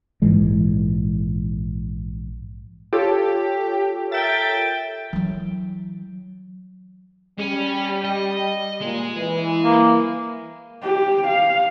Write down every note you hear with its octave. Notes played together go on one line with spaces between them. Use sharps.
A#1 G#2 E3 G#3
F4 G4 A4 C#5
A#4 E5 G5 A6
E3 F#3
G3 C#4
D#5
A#2 G#3
E3
A#3
G4
F5